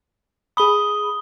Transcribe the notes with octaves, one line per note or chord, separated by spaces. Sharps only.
G#4 B5 D#6 G7